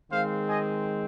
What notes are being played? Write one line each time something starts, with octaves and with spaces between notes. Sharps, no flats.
D#3 G#3 C4 C5 F5
D#5 G#5